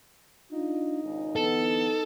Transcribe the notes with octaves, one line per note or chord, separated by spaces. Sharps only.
D4 D#4 F4
G#1 C#2
D3 E3 B3 A4